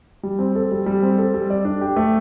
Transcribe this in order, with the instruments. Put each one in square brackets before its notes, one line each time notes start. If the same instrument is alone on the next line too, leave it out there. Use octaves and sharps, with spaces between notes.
[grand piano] G3
C4
A4
G3
G3
C4
A4
G3
D5
D4
G4
A3